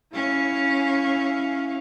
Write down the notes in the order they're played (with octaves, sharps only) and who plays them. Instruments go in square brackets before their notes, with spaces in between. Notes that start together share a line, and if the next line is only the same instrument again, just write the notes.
[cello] C#4 [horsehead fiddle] E4 F5